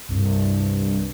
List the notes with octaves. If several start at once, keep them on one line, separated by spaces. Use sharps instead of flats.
C2 G2